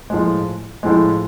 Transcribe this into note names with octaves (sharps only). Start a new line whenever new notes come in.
A2 F3 G#3
A2 F3 G#3